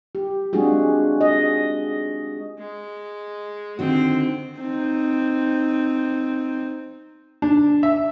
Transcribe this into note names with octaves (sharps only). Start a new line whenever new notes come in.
G4
G#3 C4 D4 F4 F#4 G#4
D#5
G#3
D3 D#3 C4 F#4
C4 D#4
D4
E5